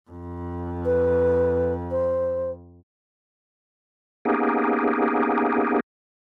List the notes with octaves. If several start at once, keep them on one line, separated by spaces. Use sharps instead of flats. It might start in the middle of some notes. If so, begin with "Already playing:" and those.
F2
B4
C5
A#3 B3 C#4 D#4 G4 G#4